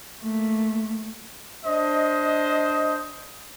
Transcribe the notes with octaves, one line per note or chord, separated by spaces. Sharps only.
A3 A#3
D4 C5 D#5